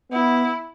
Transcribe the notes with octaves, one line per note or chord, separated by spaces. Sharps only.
B3 E4